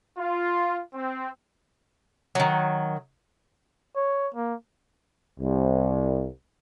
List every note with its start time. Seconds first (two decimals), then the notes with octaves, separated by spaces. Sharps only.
0.17 F4
0.94 C4
2.35 D#3 F#3
3.96 C#5
4.34 A#3
5.40 C2